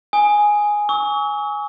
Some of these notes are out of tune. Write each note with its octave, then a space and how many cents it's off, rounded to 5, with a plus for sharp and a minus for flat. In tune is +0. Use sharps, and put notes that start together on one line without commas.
G#5 +0 D#6 +0
C#6 +35 E6 -40